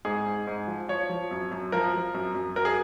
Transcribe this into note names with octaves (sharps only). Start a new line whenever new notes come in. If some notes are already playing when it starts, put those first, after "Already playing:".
G#2 G#4
G#2
G#2
F3
F3 C#5
F3
F#2
F#2
F3 A#4
F3
F#2
F#2
F#3 A#4
G#4